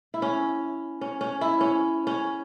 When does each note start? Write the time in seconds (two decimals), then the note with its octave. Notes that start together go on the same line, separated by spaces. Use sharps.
0.14 E4
0.22 C#4
1.01 C#4
1.21 C#4
1.41 E4
1.61 C#4
2.07 C#4